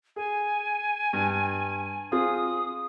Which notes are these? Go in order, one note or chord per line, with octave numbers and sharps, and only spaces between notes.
G#4 G#5
G2
C4 F4 G#4 D#6